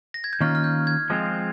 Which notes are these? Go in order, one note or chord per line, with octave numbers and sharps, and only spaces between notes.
A#6
G#6
G6
D#3 A#3 C#4 F4 F6
F6
G6
G#6
F3 G#3 C4 F4